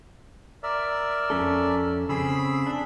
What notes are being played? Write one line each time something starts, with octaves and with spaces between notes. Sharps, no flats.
A#4 D5 E5
F2 C#4 A4
C#3 C4 G#4 B5 E6
D4